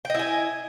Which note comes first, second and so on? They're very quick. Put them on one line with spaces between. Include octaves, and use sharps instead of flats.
G5 D#5 E4 G#5